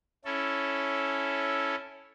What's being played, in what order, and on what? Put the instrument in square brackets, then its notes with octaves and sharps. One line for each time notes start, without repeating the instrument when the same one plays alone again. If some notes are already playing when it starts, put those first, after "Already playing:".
[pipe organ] C#4 E4 A4